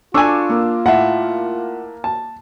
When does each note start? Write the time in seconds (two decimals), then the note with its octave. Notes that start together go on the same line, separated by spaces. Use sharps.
0.14 D4 F4 A4 G#5 C#6 D6 E6
0.50 A#3
0.86 A2 E5 F#5
2.04 A5